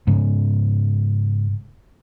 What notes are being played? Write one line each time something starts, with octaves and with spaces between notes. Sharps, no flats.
G#2 C#3